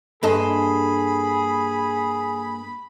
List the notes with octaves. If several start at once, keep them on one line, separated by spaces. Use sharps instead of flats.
G2 A#3 G#4 A4 D#5 B5 C6